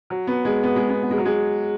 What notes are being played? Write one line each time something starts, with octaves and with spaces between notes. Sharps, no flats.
F#3
B3
G#3
B3
G#3
B3
B3
G#3
F#3
G#3